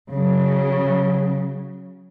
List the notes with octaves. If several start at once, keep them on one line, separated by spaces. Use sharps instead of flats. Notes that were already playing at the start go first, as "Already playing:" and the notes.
C#3 F#3